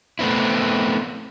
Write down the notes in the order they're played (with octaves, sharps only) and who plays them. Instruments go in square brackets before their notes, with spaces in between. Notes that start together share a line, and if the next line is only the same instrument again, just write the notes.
[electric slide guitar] A3 B3 C4 E4